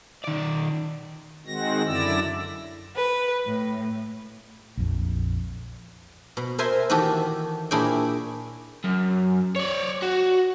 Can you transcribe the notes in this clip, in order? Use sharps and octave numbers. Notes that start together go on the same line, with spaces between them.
D#3 D5
D#3 G#3 C4 F#4 A#6
F#2 D3 E4 D5 E6 A#6
B4
A2
A#1 F2
B2
A#4 C5 E5 G#5 C6
D#3 E3 F#4 G4 A4
A#2 D4 E4 G#4 C#5 G5
F#2
C#5 D5
F#4